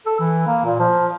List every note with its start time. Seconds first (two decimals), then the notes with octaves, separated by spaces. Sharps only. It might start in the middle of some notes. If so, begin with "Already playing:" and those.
0.06 A4
0.19 E3
0.47 A#3
0.65 A#2
0.80 F3